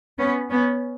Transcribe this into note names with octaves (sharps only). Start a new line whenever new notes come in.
B3 C#4
B3 C#4